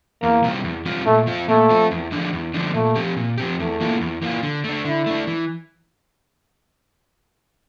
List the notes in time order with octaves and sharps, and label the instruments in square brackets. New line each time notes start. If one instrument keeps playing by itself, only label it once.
[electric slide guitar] E2 [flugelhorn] A#3
[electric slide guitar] C3 G3 C4 F4
E2
C3 G3 C4 F4
[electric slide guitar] A#2 [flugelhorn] A3
[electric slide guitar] F3 C4 F4
[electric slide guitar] A#2 [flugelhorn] A3
[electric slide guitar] F3 C4 F4
E2
D3 F3 A3 D4
E2
D3 F3 A3 D4
[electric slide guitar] A#2 [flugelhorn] A3
[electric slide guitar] F3 C4 G4
A#2
F3 C4 G4
[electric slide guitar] E2 [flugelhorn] A3
[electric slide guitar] E3 A#3 F4
E2
E3 A#3 F4
D3
A3 D4
[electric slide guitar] D3 [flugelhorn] E4
[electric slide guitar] A3 D4
E3